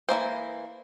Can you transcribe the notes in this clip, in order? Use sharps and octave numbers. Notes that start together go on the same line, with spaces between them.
E3 F3 A#3 C5